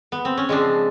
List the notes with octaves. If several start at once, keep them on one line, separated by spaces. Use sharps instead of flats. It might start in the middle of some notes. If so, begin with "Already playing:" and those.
B3
C4
C#4
C#3 F3 G#3 C4 D4